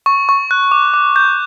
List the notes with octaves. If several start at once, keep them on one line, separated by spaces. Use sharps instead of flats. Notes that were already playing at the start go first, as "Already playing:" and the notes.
C#6
C#6
F#6
D6
D6
G6